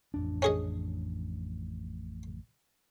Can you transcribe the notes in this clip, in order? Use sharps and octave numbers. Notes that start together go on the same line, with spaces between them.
A1 F2 D4
C#4 G#4 D#5